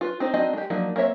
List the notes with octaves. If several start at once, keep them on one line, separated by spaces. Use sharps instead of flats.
F4 B4
C4 D#4 C5
C4 D4 D#4 F#4 D#5
G#3 G4
F3 F#3 A#3 D4 D#4
A#3 C4 C#5 E5